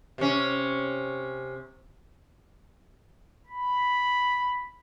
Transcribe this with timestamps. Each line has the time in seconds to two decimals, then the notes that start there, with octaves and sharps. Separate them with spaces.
0.18 C3 C#4
3.47 B5